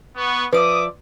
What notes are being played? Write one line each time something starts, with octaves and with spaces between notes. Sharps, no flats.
B3 C#6
F3 B4 D5 E5 D6 D#6